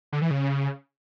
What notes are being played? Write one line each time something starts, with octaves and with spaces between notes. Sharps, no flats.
D3
E3
C#3